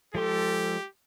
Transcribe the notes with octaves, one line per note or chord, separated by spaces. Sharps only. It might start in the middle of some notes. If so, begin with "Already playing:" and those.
F3 G#3 G4 A4 C6